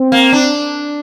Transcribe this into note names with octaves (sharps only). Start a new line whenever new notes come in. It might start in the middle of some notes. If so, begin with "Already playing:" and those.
Already playing: C4
A#3
D4